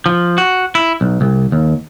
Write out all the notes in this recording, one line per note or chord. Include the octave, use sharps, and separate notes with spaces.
F3
F#4
E4
B1
C2
D#2